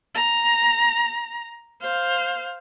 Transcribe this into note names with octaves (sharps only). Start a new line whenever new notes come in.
A#5
C5 F5